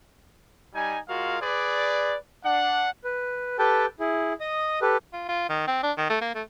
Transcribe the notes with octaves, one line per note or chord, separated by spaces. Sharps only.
G3 D#4 G#5
G#3 F4 F#4 A#4 F5
G#4 B4 D5
D4 F#5
B4
G4 A4 B4 G5 A5
E4 G#4
D#5 D#6
G4 A4 B4
F4
F4
D#3
C4
D4
D#3
A3
A#3
A3